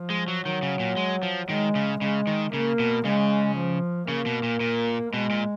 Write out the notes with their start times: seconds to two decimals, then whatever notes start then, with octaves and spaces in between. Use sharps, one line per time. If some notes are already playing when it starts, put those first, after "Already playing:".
Already playing: F3
0.10 G#3
0.28 F#3
0.45 D#3 F#3
0.62 C#3
0.80 A#2
0.97 G#3
1.23 F3
1.49 D#3 G#3
1.75 C#3
2.01 C#3 G#3
2.27 D#3
2.52 C#3 A#3
2.79 B2
3.05 C#3 G#3
3.56 F3
4.08 C#3 A#3
4.26 B2
4.43 A#2
4.60 A#2
5.13 B2 G#3
5.30 A#2